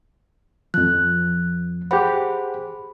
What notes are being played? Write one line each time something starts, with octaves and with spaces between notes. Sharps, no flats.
F2 F3 F#6
G4 G#4 C5 F#5 B5